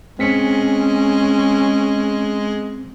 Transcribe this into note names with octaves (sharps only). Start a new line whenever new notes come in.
G#3 C4 C#4 B6 C#7